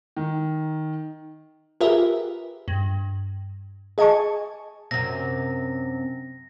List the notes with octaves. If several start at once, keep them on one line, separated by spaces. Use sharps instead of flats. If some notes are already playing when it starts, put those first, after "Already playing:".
D#3
F4 G4 G#4 A#4 B4 E5
G2
G#4 D#5 G#5 A5 C#6
F#2 C3 A#6